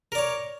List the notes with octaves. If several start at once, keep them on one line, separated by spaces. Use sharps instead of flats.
A#4 C#5 D5